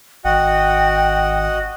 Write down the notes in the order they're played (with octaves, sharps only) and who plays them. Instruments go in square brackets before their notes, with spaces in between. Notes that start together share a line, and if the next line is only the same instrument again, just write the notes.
[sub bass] G#1 [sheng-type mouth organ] F#4 D#5 F#5 [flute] G5